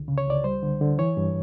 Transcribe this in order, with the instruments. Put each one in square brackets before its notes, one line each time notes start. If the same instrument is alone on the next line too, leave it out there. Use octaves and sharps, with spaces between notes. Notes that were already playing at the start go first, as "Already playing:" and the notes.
Already playing: [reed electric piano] C#2 D3
C#3
C#5
C#2 D5
G3 C5
D3
D3
E3 C#5
G2